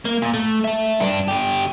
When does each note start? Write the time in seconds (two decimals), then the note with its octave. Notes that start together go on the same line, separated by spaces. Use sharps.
0.05 A#3
0.22 A#2
0.34 A3
0.64 E5 A5
1.00 G2 D4
1.28 D3 G4